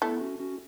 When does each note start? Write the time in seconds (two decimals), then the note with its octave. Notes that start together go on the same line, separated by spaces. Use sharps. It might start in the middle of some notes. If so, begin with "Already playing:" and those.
0.02 A3 B3 E4
0.21 C#4 F#4
0.40 C#4 F#4